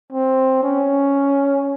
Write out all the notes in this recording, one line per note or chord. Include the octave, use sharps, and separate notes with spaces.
C4
C#4